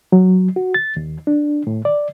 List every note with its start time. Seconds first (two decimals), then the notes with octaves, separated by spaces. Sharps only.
0.12 F#3
0.56 F#4
0.74 A6
0.96 D#2
1.27 D4
1.67 A2
1.85 D5